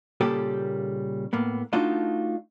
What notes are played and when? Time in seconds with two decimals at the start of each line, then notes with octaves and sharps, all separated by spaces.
0.21 A#2 C#3 G3 A#3 G4 A4
1.33 A2 A#3 B3
1.73 A3 D4 D#4 F4 F#4 D#5